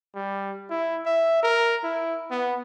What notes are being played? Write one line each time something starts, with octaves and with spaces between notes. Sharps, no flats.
G3
E4
E5
A#4
E4
B3